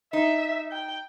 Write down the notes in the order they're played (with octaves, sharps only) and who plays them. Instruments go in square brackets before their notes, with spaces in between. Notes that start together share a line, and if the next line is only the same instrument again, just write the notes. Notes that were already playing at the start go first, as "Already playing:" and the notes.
[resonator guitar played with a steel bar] D#4 [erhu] E5
[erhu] G5